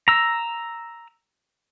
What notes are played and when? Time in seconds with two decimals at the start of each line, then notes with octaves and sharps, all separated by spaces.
0.08 A#5 E6